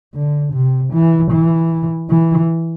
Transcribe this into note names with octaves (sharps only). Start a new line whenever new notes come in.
D3
C3
E3
E3
E3